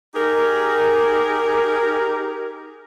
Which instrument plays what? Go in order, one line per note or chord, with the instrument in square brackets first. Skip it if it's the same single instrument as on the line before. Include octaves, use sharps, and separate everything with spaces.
[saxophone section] D#4 G4 G#4 A#4